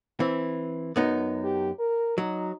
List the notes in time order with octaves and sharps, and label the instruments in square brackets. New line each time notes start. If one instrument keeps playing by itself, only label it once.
[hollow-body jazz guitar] E3 C4
F#2 B3 D#4
[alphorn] G4
A#4
[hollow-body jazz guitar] F#3 [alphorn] D#4